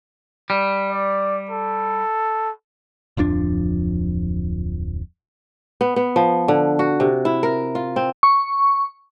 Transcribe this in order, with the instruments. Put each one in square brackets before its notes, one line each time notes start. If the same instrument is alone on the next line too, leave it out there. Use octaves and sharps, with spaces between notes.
[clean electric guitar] G3
[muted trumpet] D5
A4
[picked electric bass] D1 F2 F3 D4
[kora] B3
B3
F3
D3
F#4
C3
E4
A#4
F4
C4
[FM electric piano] C#6